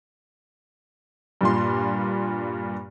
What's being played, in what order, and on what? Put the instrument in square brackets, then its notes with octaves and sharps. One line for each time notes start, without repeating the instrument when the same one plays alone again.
[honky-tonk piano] G2 A#2 C6